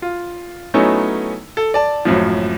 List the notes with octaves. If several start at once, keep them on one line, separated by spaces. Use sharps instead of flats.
F4
F#3 A3 B3 C#4 D#4 E4
A4
D5 A5
G#1 F#2 A2 F3